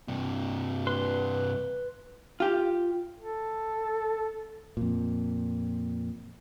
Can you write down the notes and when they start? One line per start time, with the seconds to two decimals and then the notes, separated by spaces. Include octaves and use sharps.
0.08 G2 C3
0.87 B4 C6
2.40 F4 G4
3.20 A4
4.77 F2 A#2